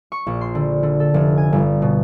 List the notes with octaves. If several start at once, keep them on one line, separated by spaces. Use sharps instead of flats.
C#6
A#1
C6
D3
D3
A4
F1
G#5
G1
B2